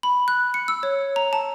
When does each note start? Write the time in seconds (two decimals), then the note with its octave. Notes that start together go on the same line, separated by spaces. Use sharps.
0.03 B5
0.28 F#6
0.54 C#7
0.68 E6
0.83 C#5
1.16 A#5
1.33 A5